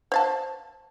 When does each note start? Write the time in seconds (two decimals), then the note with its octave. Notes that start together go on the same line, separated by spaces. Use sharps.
0.12 C5 F5 A5